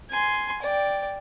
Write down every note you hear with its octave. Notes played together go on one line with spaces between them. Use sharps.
G#5 C6
D5 G5